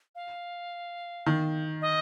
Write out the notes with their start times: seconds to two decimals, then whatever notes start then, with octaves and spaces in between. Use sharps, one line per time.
0.15 F5
1.26 D#3
1.82 D#5